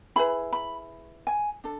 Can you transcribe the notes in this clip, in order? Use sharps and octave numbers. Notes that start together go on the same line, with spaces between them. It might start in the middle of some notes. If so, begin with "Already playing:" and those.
E4 G#4 B4 B5
B5
G#5
D4 A4